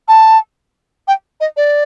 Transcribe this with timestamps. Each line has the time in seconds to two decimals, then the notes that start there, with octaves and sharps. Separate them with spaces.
0.08 A5
1.08 G5
1.41 D#5
1.57 D5